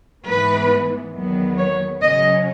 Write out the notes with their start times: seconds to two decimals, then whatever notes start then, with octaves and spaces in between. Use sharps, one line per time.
0.26 G#2 E3 B3 B4
1.14 E2 D#3 F#3 B3
1.58 C#5
2.02 C#3 F#3 C#4 D#5